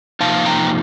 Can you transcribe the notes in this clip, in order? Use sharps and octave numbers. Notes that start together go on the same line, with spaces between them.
C3 F3 A#3 D#4 F5 A5
G5 A#5